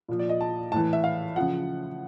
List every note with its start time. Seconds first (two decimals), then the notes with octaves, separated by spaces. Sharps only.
0.08 A#2 F3
0.19 D5
0.29 D#5
0.41 A5
0.72 A2 E3 A5
0.93 E5
1.04 F5
1.36 C#3 F3 F#5